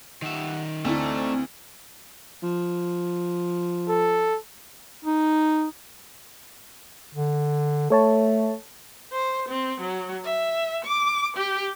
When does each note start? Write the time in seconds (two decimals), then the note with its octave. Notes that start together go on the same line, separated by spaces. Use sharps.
0.22 D#3 G4 E5 F#5
0.85 D2 E3 A3 C4 D4 D#4 A#5
2.43 F3
3.89 A4
5.05 D#4
7.15 D3
7.90 A3 A4 C#5 A5
9.12 C5
9.49 C4
9.80 F#3
10.24 E5
10.85 D6
11.37 G4